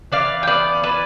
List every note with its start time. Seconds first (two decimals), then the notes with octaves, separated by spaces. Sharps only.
0.12 E3 D5 F5
0.43 G5
0.47 B3 D5 F5
0.83 E3 B4 D5